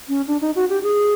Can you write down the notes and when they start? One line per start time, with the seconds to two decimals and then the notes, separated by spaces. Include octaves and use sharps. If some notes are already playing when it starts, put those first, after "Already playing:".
0.09 C#4
0.27 D4
0.41 D#4
0.56 F#4
0.69 G4
0.83 G#4